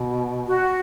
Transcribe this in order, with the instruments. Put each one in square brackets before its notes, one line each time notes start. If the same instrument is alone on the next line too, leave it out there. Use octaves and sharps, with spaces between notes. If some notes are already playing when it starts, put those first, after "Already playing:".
Already playing: [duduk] B2
[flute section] F#4